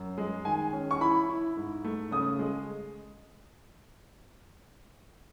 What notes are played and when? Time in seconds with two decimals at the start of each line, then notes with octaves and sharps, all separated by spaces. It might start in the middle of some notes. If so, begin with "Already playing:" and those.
Already playing: F#2
0.18 G#3
0.45 D#3 G#5
0.73 C#4
0.91 C#6
1.01 E4 B5
1.29 E4
1.57 G#2
1.84 A3
2.11 C#3 D#6
2.39 G#3